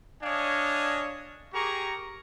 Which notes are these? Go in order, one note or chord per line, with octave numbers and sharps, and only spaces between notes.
D4 C#5 D#5 F5 G#5
G4 G#4 A#4 A#5 C#6